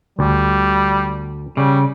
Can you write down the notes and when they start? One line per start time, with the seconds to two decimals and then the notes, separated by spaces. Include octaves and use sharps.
0.19 D2 G3
1.57 C#3 G3